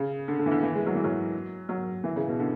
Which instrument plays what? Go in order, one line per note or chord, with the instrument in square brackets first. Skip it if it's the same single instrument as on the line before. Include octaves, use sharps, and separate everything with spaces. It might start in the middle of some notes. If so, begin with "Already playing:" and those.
Already playing: [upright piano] C#3
D3
D3
E3
D3
E3
G#3
F#3
E3
F#3
F#3
E3
C#3
B2
D3